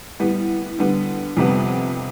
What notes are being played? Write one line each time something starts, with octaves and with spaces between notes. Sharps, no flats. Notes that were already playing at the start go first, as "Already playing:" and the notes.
A2 G3 B3
D3 G3 B3
F2 C3 G3 B3